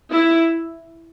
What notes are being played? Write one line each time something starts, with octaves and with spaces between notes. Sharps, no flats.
E4